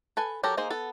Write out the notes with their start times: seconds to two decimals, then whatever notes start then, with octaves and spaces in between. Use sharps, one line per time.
0.17 A4 B4 G#5
0.43 F#3 G4 A4 A#4 A#5
0.57 A#3 D#4 G#4 C5
0.70 B3 A4